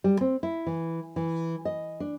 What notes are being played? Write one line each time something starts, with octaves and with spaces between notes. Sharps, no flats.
G3
C4
E4
E3
E3
D#5
D4